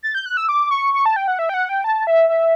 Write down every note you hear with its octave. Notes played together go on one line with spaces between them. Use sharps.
A6
G6
F#6
E6
D6
C#6
C#6
A5
G5
F#5
E5
G5
F#5
G5
A5
E5
E5